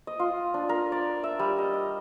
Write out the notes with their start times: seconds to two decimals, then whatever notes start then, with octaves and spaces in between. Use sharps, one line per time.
0.07 D#5
0.20 F4
0.54 D4
0.69 A#4
0.92 D5
1.24 E5
1.39 G3
1.58 D#5
1.74 D#5